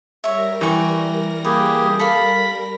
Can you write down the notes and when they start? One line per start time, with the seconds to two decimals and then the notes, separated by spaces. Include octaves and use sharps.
0.24 G3 A#4 C#5 E5 A#6
0.61 E3 G5 C#6
1.44 A#3 G4 G#4 B4
1.99 A4 F5 B5